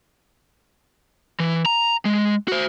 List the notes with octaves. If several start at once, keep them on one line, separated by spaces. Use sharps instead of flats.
E3
A#5
G#3
F#4 C5